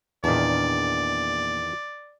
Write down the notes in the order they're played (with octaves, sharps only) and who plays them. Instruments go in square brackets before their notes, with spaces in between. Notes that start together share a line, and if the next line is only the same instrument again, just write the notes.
[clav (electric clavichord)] E2 D#3 [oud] A#2 D4 [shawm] D5